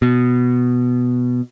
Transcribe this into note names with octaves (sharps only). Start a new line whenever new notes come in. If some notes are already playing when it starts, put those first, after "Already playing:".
B2